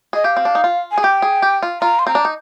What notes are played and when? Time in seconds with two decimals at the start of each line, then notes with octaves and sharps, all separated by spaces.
0.13 G#4 D#5
0.24 G4 F5
0.37 C4
0.45 D4
0.55 D#4
0.64 F4
0.92 G#5
0.98 G#4
1.03 G4 G5
1.22 G#4
1.42 G4
1.63 F4
1.82 F4 A#5
1.99 C6
2.07 C4 A#5
2.15 D4
2.25 D#4